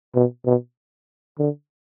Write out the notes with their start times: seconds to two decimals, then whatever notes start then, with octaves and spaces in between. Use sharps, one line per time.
0.15 B2
0.45 B2
1.39 D3